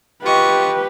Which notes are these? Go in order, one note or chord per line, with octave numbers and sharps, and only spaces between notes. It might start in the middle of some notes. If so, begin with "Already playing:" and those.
F4 G4 B4 D#5 C#6